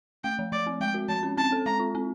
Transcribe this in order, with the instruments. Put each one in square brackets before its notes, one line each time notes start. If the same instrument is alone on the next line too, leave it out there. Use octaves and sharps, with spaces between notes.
[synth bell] A3 [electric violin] G5
[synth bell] F3
[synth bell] F3 [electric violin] D5
[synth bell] C4
[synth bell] G#3 [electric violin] G5
[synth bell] F#4
[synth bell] F3 [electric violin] A5
[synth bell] C#4
[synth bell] C4 [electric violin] A5
[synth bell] A4
[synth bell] G#3 [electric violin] A#5
[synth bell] F4
C4